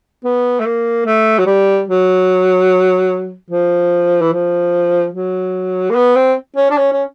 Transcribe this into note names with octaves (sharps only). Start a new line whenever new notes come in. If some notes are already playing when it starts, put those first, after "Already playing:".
B3
A3
A#3
A3
F#3
G3
F#3
F3
E3
F3
F#3
A#3
B3
C4
C#4
D4
C#4
C#4